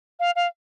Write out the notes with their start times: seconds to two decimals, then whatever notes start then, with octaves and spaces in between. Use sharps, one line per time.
0.20 F5
0.36 F5